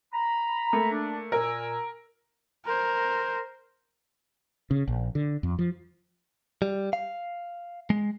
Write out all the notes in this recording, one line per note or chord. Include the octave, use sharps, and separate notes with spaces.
A#5 B5
A3 A#3
D4
A#2 A#4 G#5 E6
A#4 C5
C#3
A#1
D3
F2
F3
G3
F5
G#3